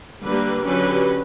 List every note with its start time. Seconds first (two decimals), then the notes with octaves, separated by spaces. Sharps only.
0.23 D3 G3 A#3 G4 B4
0.63 D3 F#3 C#4 G4 B4